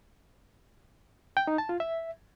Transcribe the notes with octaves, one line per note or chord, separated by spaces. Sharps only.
G5
D#4
A5
F4
E5